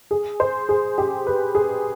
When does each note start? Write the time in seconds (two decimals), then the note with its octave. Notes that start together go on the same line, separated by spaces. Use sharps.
0.11 G#4
0.40 C5
0.69 G#4
0.98 G4
1.27 B4
1.55 G#4